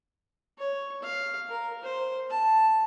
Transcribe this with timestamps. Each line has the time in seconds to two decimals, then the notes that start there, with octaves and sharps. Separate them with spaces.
0.59 C#5
1.02 F5
1.49 A#4
1.84 C5
2.30 A5